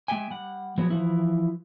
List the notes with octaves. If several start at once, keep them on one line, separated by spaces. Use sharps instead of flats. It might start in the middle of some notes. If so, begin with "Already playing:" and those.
G#3 A#3 G4 E5 G5 G#5
G3 F#5
F3 F#3 G#3 B3
E3 F3 E4